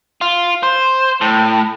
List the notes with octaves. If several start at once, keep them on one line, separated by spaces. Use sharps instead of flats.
F4
C5
A2